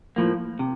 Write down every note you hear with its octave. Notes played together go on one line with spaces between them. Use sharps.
A2 F3 A#3
C3